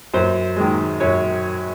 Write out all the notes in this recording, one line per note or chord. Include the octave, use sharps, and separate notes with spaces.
F#2 C5
D#3 G#3
F#2 C#5